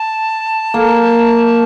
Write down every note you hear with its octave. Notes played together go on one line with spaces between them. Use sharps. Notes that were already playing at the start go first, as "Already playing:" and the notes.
Already playing: A5
A#3